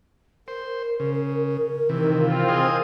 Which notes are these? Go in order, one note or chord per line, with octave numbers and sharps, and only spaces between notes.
A#4 C5
C#3
C3 D#3 E3
C4 F4
G#4 C5 D#5